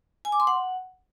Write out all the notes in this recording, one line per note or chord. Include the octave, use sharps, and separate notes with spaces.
G#5
D6
C6
F#5